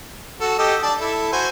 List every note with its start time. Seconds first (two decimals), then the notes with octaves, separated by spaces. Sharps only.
0.41 F#4 A4
0.59 G4 A4 D#5
0.83 D4 D5 A5
0.99 E4 A4
1.32 F#4 C5 G#5